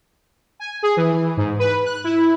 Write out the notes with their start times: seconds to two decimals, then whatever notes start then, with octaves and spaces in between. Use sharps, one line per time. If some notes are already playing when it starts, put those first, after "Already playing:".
0.60 G#5
0.83 G#4
0.97 E3
1.14 E3
1.37 G#2
1.59 B4
1.85 F#6
2.04 E4